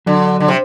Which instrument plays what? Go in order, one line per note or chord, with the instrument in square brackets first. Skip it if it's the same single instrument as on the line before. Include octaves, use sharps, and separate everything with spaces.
[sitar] D3 [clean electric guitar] F#3
[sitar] D3
C3